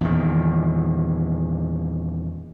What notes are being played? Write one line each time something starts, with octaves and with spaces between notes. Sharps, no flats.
E2 A#2 D#3